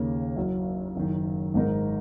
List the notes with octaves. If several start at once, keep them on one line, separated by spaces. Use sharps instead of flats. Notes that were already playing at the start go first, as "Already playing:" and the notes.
Already playing: D#2 C#3 A#3
F#1 F#2 F#3
F#1 F#2 D#3
G#1 G#2 G#3 D#4 A#4